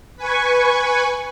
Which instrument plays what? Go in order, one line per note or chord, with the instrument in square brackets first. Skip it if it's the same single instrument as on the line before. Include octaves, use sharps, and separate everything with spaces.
[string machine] B4 G#5 C#6